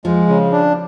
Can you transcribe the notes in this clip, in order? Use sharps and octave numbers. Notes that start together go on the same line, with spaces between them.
F3 G#3
C#3
D4